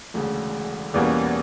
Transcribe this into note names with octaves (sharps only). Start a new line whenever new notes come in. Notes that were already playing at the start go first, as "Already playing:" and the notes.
E1 D2 C#3
E2 B2 G3 A#3 C#4